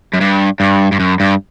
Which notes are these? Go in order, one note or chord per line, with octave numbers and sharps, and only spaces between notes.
F#2
G2
G2
G2
F#2
G2